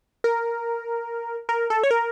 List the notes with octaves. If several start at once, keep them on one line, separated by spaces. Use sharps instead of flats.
A#4
A#4
A4
C#5
A#4